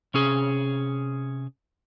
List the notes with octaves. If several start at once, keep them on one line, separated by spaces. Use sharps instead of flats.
C3 C#4 G#4